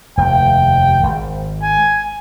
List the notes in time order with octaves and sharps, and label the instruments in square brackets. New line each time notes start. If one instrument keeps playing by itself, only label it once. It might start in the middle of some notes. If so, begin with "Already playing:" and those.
[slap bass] F1 D#2 [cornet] G5
[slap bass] G#1
[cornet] G#5